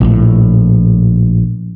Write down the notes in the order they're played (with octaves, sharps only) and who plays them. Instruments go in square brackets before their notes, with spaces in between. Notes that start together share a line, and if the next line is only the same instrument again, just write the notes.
[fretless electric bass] A#1 A2